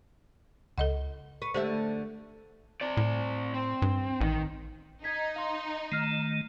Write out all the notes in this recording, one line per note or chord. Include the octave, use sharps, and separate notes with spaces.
C#2 A4 D#5 F#5
B4 C#6
D3 A3 G4 C5 E5
C4 D5
A2
C4
G2
A1 D#3
D#4 G#6 B6
F5 C6
D#3 A3 F6 C7